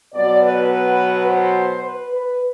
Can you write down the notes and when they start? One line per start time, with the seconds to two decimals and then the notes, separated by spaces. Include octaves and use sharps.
0.13 B2 F#3 B3 D5
0.42 B4
1.26 C5
1.82 B4
2.11 B4